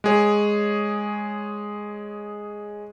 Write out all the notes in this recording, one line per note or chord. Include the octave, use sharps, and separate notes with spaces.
G#3 G#4 C#5